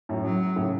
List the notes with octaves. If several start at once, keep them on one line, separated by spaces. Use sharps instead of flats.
F#2 A2
F#3
A2 C#3